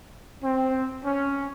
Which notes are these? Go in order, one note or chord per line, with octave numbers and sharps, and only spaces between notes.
C4
C#4